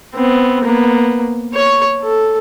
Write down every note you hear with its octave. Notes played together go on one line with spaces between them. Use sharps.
B3 C4
A#3 B3
C#5 C#6
A4